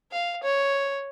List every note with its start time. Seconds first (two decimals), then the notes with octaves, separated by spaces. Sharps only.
0.12 F5
0.43 C#5